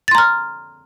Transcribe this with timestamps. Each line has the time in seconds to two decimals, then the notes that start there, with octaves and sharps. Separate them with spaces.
0.08 A6
0.11 C6
0.15 A#5
0.18 F6